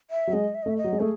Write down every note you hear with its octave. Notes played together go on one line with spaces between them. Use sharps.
E5
F#3
G#3 D#5
E5
D#5
A3 E5
D#5
F#3
G#3
A3 G#4